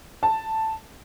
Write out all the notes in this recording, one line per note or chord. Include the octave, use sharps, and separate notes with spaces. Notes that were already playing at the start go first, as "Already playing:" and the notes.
A5